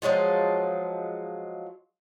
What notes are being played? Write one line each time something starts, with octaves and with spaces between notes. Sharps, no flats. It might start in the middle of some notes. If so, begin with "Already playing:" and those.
F3 F#3 G#3 F4